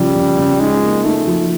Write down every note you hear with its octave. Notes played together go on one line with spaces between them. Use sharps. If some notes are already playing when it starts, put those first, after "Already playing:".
Already playing: C#3 F3 G3
C#3
C#3
G#3 D#4
A#3
A3 D#4
F3